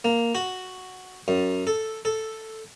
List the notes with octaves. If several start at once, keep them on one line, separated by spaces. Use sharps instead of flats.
A#3
F#4
F#2
A4
A4